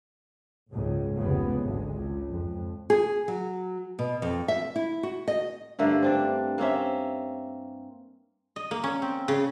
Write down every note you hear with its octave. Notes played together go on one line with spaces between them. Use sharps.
F#1 C#2 G#2 C#3
F1 C#2 C#3 B3
G#1 D2 G#3
C#2
F2
G#4
F#3
B2
F2
E5
E4
F#4
D#5
G2 D3 A3 A#3
C4 D4 D5
A#3 C4 C#4 E5
D#5
A#3
C#4
C4
C#3